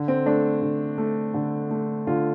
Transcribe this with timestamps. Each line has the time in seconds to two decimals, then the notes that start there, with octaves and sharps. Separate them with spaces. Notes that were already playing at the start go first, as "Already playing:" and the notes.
Already playing: D3
0.08 C4
0.26 A3 D4
0.62 D3
0.98 A3
1.34 D3
1.71 A3
2.07 D3 F4